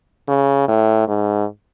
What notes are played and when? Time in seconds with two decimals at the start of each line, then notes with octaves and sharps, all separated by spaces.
0.28 C#3
0.68 A2
1.08 G#2